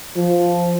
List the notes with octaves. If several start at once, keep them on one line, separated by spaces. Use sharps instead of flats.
F3